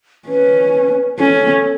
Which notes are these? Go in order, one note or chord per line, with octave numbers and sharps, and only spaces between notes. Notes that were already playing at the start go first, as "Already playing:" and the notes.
C#4 B4
C#4 A4